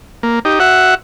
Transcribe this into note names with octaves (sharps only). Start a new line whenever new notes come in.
A#3
D#4 G4
F#4 E5 F#5